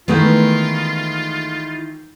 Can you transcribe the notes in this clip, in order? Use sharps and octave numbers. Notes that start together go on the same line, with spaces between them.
D#3 E3 G#3 A3 B3 E4 F4